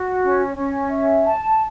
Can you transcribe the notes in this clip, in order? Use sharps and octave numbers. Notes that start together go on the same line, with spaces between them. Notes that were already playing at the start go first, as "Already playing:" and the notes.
Already playing: F#4
C#4
C#4
E5
A5